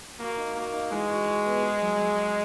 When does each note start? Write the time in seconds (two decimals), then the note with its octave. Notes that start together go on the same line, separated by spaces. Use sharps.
0.20 A#3 F#4
0.37 D#4
0.55 A#3 F#4
0.73 D#4
0.91 E3 G#3
1.09 F#4
1.27 F#4
1.45 B3
1.63 G#4
1.81 F#3
1.99 F#3
2.17 G#4